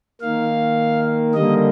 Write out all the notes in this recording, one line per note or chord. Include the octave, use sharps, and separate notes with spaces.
D#3 A#3 F5
D3 G3 A#3 D#5